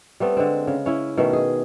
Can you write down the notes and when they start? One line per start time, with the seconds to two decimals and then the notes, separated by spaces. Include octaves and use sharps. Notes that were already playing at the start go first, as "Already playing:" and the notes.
0.20 G3 A3 B3 C4
0.37 D3 G#3 C4
0.67 C#3
0.86 C#4 E4
1.17 B2 D#3 A3
1.33 G#4